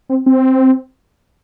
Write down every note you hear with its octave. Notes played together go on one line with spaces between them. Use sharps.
C4
C4